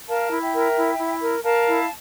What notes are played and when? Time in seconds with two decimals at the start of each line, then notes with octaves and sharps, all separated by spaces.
0.08 A#4 F5 A5
0.31 E4
0.42 E5 G5
0.53 A#4
0.77 E4
0.98 E4
1.22 A#4
1.43 A#4 F5 A5
1.66 E4